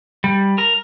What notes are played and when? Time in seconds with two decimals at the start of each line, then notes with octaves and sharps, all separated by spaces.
0.24 G3
0.58 A#4 A#5